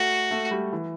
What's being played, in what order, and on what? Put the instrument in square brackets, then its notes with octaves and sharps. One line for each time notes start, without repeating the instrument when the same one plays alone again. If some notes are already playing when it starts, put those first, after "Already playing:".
Already playing: [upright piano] A3 [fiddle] F#4
[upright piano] A3
G3
E3